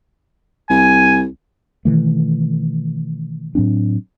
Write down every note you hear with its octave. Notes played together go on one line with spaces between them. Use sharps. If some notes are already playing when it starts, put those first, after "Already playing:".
C2 G#5
B2 D#3 E3 A3
A2 F#3 C4 D4